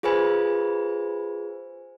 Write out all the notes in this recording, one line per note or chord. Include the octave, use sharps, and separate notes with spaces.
F4 G#4 B4 C5 G#5 B5